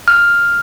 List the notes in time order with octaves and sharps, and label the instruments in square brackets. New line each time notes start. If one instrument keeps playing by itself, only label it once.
[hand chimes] F6